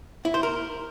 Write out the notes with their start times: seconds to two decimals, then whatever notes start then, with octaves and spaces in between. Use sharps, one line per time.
0.25 E4
0.34 C5
0.43 A#4